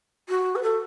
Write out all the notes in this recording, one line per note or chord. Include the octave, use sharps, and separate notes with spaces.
F#4
B4
A4